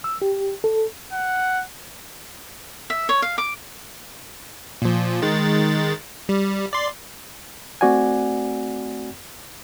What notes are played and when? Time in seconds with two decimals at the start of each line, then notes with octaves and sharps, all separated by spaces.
0.04 E6
0.22 G4
0.64 A4
1.13 F#5
2.90 E5
3.09 C#5
3.22 F5
3.38 D6
4.82 A#2 F3
5.22 D#3 G#3 A6
6.29 G3
6.73 D5 C6
7.81 A3 C4 F#4 D5 F#5 G#5